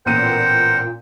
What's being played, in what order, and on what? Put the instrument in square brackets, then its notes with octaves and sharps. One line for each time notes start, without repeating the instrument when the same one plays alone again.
[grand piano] A1 B3 D#7 [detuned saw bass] A#2 [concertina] A#4 C5 F#5 [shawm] G5